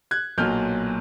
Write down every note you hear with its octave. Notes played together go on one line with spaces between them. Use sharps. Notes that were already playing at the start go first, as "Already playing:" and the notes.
F#6 G#6
B1 A#2 F#3 F6 G6